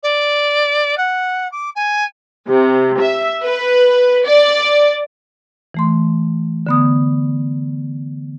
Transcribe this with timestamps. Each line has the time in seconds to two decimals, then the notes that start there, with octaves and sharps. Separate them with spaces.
0.03 D5
0.98 F#5
1.52 D6
1.76 G#5
2.48 C3
2.98 E5
3.42 B4
4.25 D5
5.74 E3 A3 C6
6.67 D3 B3 D#6